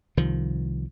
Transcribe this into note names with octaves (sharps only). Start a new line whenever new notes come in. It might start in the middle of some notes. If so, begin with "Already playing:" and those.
C2 D#3 F3